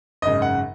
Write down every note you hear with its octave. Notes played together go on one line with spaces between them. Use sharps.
G#1 F#2 C#3 D#5
F#5